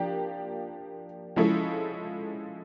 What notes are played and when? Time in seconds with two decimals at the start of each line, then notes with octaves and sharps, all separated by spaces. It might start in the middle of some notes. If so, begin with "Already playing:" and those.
Already playing: F3 A#3 D4 G4
1.36 F3 G#3 C#4 E4 A4